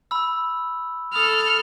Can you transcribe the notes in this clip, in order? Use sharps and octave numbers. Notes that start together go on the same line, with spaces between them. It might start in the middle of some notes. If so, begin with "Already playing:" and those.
B5 E6
A4 B5 D#6 F6